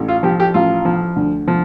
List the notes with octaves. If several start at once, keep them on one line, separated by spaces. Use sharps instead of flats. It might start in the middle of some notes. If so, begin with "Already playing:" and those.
Already playing: A1
F4
F3 G4
G4
A1 F4
F3
D2
F3